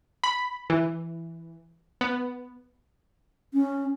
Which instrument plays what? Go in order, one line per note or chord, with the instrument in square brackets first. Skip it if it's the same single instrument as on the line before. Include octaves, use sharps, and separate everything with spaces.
[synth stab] B5
E3
B3
[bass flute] C#4